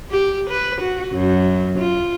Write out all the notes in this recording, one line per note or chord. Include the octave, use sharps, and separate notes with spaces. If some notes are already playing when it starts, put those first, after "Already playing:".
G4
B4
F#4
F#2
F4